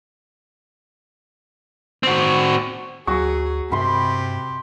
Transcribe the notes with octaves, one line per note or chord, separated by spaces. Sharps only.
C4 F#4
D2 F#3 F#4 G#4 C#6
G2 C3 G4 B5 C6